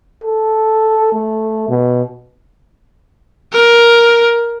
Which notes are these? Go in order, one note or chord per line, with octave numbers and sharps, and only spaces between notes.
A4
A3
B2
A#4